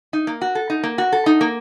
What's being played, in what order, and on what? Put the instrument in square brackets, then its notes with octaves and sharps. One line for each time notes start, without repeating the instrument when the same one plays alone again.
[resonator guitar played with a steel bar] D#4
A#3
F#4
A4
D#4
A#3
F#4
A4
D#4
A#3